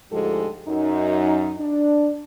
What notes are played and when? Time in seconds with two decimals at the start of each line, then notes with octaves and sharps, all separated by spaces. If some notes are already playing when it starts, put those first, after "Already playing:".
0.11 D2 G#2 F3 G#3 G4 A4
0.67 F#2 D#4
1.59 D4